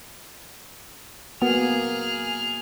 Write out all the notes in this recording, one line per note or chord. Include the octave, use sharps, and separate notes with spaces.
A#3 B3 F#4 G#4 F6